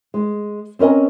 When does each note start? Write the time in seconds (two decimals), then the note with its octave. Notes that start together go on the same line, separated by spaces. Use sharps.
0.14 G#3
0.79 C4 C#4 A#4 D#5 G#5